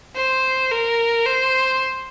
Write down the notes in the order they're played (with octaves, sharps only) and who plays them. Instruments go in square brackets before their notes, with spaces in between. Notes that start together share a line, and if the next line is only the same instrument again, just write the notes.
[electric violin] C5
A#4
C5